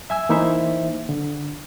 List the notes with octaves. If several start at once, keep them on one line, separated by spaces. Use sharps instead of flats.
E5 G#5 E6
E3 A#3 D#4 E4 C5 E5
D3